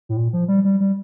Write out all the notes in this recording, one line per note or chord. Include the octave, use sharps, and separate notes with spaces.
A2
A#2
F3
G3
G3
G3